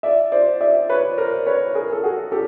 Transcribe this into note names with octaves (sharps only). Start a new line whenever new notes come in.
D5 E5
C5 D5
D5 E5
B4 C#5
A#4 C5
B4 C#5
G#4 A#4
A4
F#4 G#4
G4 A4